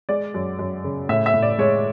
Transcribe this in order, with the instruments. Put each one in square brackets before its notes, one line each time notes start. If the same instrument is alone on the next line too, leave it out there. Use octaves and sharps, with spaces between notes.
[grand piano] G#3 D5
F#2
F#2
C#3
A2 E5
E5
A2
D5
G#3 C#5